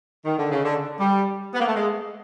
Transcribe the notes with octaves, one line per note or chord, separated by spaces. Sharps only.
D#3
D3
C#3
D3
G3
B3
A#3
A3
G#3